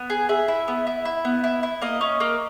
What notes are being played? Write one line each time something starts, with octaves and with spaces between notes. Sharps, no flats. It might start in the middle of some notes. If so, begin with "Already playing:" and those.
Already playing: B3
G#4
G#4 E5
E4
B3
E4
E4
B3
E4
E4
A#3 D#5
C#4
A#3